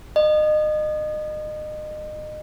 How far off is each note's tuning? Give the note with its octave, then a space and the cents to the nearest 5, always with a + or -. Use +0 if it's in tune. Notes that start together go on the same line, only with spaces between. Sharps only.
D#5 -30